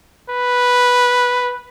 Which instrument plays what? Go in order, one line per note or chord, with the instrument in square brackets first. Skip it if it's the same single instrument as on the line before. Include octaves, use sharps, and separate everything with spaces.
[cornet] B4